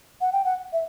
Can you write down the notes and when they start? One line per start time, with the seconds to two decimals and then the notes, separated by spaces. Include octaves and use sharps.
0.21 F#5
0.33 G5
0.45 F#5
0.73 E5